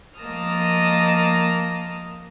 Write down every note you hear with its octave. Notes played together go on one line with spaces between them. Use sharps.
F3 A#3 D#5 A5 D#6 F6